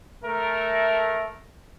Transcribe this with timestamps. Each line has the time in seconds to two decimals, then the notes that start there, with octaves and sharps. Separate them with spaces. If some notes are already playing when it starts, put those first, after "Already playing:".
0.25 A3 A#4